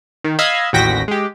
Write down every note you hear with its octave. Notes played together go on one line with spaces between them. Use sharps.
D#3
D#5 F5 B5 E6 G#6
A1 D#2 F#4 G5 A#6 B6
G#3 G4